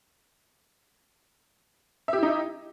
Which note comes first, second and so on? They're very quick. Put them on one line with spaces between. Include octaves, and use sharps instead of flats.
E5 G4 E4 D#4 D#5